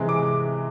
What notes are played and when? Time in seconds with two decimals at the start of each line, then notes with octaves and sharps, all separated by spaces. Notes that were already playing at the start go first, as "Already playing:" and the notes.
Already playing: C3 E3 G#3
0.09 D6